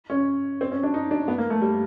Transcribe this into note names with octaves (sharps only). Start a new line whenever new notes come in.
C#4
C4
C#4
D4
D#4
D4
B3
A#3
A3
G3